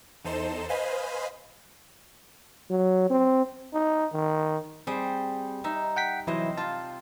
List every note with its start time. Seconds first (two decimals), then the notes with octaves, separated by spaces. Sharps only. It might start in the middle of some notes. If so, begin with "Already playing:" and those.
0.24 E2 D#4 A4 C5 E7
0.69 B4 C5 D#5 F5 G#5 B5
2.70 F#3
3.10 C4
3.74 D#4
4.13 D#3
4.87 G3 C4 G#4 C5
5.64 D#4 E5
5.96 F#5 G5 B6
6.27 C3 E3 F#3 E4 C5 D#5
6.58 F4 A5